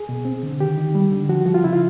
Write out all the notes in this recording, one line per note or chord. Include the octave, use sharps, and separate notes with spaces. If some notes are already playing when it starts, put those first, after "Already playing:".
Already playing: G#4
B2
C4
D3
D#3 G4
D#3
G3
D3
F3 F#4
F3 F#4
F4
C#3 E4
F4